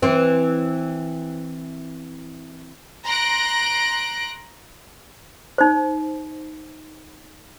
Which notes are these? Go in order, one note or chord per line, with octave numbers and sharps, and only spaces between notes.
E3 C4
A#5 C6 F#6 A#6 D7
D#4 C5